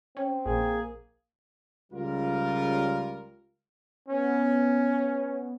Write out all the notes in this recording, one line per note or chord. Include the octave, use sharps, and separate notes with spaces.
C4 C#4
A#1 A#3 G#4
C#2 G3 F4 A#4
B3 C#4